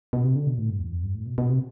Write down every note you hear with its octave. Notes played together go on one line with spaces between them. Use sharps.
B2
C3
D3
B2
A2
G2
E2
F2
G2
A2
B2
B2
C3